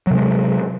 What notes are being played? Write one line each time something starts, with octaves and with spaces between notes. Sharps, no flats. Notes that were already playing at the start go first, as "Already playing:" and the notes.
C3 F#3 G#3